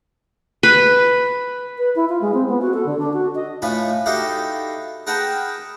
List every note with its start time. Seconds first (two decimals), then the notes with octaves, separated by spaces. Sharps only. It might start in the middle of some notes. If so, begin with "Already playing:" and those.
0.63 B4
1.78 B4
1.95 E4
2.09 F4
2.21 G#3
2.34 C4
2.48 B3
2.61 F#4
2.74 A4
2.86 D3
2.98 D4
3.13 F#4
3.35 D#5
3.62 A2 F3 A3 B4 G#5 B5
4.06 D#4 E4 F#4 G4 A4 F5
5.07 G#4 A#4 B4 F#5 G5 A5